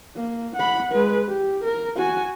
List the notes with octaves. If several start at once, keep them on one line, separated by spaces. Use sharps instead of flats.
A#3
F#5 B5
G#3 B4
G4
A#4
F#4 G#5